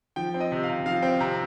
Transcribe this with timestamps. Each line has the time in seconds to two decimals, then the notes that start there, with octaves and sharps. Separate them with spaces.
0.16 F3 G5
0.34 C4
0.40 D#5
0.52 C3
0.63 F5
0.69 C3
0.86 F3 F5
1.02 C4 G5
1.20 C3 A#5